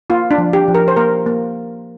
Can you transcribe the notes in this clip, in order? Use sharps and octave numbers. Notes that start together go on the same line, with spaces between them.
A#3 F4
D4
F3
G4
F3
A#4
C5
A#3 A#4
A#3